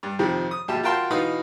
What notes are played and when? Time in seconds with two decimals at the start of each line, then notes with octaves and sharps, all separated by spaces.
0.03 G2
0.19 F2 C3 D#3 F3
0.51 D#6
0.68 A#1 B2 G4 A5
0.83 F4 F#4 A#4 G5 A5 C6
1.10 B2 E3 D#4 B4 F5 D#6